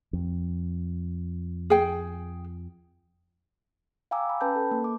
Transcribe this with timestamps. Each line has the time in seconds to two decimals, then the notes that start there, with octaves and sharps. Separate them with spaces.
0.13 F2
1.70 G#4 G5
4.11 F5 G5 G#5 A#5 D6 E6
4.29 B5
4.41 C#4 B4 G5 A5 B5 G6
4.56 A4
4.71 A#3
4.84 D6